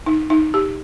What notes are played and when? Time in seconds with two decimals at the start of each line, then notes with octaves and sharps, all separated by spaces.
0.06 D#4
0.30 D#4
0.54 G4